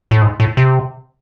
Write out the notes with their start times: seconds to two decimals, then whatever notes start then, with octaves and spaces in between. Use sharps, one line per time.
0.11 A2
0.22 G#2
0.40 A2
0.57 C3